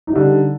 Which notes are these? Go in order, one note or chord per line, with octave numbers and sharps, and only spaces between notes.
D3 G3 D4 D#4